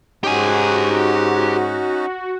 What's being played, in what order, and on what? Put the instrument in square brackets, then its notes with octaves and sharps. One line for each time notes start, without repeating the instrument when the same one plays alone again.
[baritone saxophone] G#2 [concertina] C#4 D#4 [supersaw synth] F#4 [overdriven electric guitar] G4 G#5